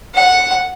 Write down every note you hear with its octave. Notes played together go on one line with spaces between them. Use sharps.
F#5